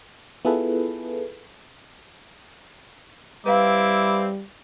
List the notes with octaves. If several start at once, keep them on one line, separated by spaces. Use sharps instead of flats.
B3 E4 F4 G#4 A4 B4
G3 C4 E4 B4 F5 D6